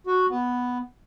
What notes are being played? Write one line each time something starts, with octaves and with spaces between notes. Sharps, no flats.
F#4
B3